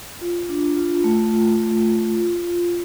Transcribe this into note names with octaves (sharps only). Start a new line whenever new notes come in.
F4
D4
F4
A3
F4
A3
F4
F4
F4